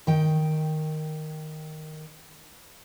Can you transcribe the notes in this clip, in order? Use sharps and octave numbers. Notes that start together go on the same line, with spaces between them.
D#3 G5